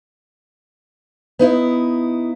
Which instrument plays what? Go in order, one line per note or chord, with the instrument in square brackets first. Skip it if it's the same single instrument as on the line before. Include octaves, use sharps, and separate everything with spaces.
[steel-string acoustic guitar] B3 D#4 E4